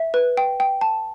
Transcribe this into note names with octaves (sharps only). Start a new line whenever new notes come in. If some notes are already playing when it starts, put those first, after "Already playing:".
Already playing: E5
B4
G5
G5
A5